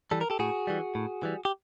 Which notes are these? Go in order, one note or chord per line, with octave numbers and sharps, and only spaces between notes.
E3 G3 A4
A#4
G4 A4
A2 F#4 G#4
E3 G3
A2
E3 G3
G4